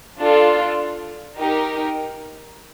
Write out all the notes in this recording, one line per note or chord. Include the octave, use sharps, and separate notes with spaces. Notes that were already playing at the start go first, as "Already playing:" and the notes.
D4 F4 A4
D#4 G4 A#4